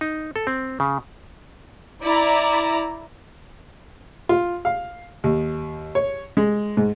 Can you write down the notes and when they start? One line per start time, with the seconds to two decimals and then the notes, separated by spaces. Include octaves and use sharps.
0.01 D#4
0.36 A4
0.47 C4
0.80 C#3
2.02 E4 D5 A#5
4.29 F4
4.65 F5
5.24 D#2
5.95 C#5
6.37 G#3
6.77 G#2